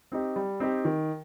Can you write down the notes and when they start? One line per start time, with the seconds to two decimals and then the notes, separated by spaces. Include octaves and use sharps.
0.12 C4 D#4 G4
0.36 G3
0.60 C4 D#4 G4
0.85 D#3